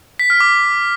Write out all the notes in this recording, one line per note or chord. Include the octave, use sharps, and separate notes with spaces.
B6
F6
D6